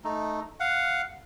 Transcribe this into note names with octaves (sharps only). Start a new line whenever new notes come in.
A3 D#4
F5 F#5